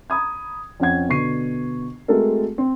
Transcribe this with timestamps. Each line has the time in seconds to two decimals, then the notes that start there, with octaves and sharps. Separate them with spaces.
0.10 A#5 B5 D#6 G#6
0.80 F2 C#4 F#5 G#6
1.09 B2 D3 B3 C#6 C7 D#7
2.08 G#3 A3 C4 F#4 A4 A#4
2.58 C4